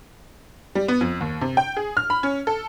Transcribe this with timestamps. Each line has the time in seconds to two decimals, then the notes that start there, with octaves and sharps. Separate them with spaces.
0.75 G3
0.88 B3
1.01 F2
1.21 D#2
1.41 C3
1.57 G5
1.77 G#4
1.97 F6
2.10 B5
2.23 C#4
2.47 A4